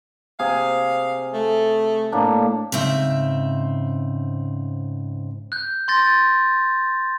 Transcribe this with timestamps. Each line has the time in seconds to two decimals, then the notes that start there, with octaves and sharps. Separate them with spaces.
0.39 C3 G#4 F5
1.34 A3
2.12 A2 A#3 D4
2.72 G#2 C#3 C4 E5
5.52 F#6 G6
5.88 C6 G6 A6 A#6